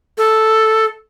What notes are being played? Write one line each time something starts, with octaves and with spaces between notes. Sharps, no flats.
A4